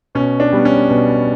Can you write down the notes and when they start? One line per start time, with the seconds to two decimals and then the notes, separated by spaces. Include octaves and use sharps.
0.15 B2 C#4
0.40 D4
0.52 G3 B3
0.65 C#4
0.90 B2